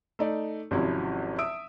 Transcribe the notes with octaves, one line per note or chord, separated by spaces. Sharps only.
A3 D#4 D5
G#1 C3 F3 F#3 C#4 E4
E5 D#6 E6 D7